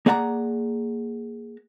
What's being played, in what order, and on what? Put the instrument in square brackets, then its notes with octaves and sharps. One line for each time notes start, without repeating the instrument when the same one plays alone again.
[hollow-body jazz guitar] A#3 G#4 D5 F#5 A5 A#5